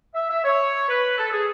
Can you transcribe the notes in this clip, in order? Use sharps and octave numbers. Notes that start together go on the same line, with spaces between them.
E5
E5
C#5
B4
A4
G#4